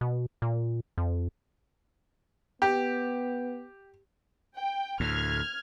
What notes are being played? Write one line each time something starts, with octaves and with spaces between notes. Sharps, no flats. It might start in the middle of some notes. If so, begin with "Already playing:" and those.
B2
A#2
F2
B3 G4
G5
D2 A2 F6 G#6